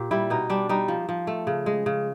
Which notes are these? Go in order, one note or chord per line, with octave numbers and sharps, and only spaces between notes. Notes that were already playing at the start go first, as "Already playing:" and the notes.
Already playing: A#2 G4
G3 E4
B2 D#4
G3 D4
G3 D#4
F3
F3
A3
C#3
G#3
C#3